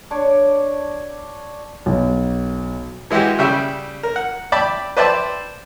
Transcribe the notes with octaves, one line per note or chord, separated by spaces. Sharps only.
D4 C#5 D5
B1
E3 G#3 E4 F#4 G4
C#3 G3 E5 G5
A#4
F#5
D5 E5 G5 A5 B5 D6
B4 C5 D5 E5 G5 A5